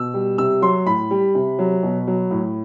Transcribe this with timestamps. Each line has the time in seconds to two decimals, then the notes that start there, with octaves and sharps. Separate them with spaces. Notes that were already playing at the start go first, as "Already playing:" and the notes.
Already playing: B2 E6
0.14 G3
0.38 C3 E6
0.62 F#3 C6
0.86 A2 B5
1.11 G3
1.35 C3
1.59 F#3
1.83 B2
2.07 F#3
2.31 A2